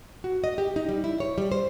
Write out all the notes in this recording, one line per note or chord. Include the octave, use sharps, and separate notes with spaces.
F#4
D#5
G4
D#4
G3
E4
C#5
G3
C5